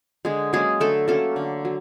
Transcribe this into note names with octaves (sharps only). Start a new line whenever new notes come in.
D3 G#3 G#4
F#3 G#3 A#3 C#4 G#4
D3 A3 A4
F#3 A3 A#3 C#4 A4
D3
F#3